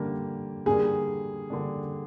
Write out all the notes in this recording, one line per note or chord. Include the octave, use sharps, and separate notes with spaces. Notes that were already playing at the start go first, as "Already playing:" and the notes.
Already playing: D3 G3 A#3 D4
D3 G3 A#3 D4 G#4
D3 G3 A#3 D4